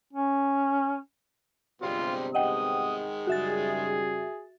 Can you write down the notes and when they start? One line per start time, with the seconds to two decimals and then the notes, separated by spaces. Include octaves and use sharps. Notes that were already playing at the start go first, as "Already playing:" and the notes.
0.13 C#4
1.82 G1 C3 G3 G#3 C4 F4
2.35 D#3 G#3 D#5 F#5 G5 D#6
3.27 F#2 C#3 G3 F#4 G#4 E5 A6